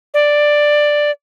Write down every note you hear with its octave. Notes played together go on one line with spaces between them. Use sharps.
D5